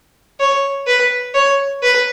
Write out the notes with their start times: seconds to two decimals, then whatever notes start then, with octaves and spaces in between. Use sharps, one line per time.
0.40 C#5
0.87 B4
1.34 C#5
1.82 B4